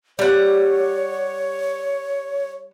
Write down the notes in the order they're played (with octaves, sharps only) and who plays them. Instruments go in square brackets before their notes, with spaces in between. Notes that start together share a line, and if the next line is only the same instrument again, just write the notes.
[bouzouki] G3 F#5 [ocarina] C#5